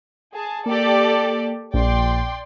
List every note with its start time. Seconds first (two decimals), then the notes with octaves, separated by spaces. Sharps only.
0.34 G#4 A5
0.66 A#3 G4 A4 D5
1.74 A#1 D5 G5 C6